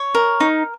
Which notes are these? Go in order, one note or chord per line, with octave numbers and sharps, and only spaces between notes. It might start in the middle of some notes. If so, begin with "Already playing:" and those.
Already playing: C#5
A#4
D#4